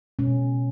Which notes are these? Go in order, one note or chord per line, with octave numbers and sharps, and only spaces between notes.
B2 G#3 C#4